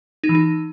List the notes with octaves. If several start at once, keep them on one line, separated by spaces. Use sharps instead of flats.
D#4
E3
D#4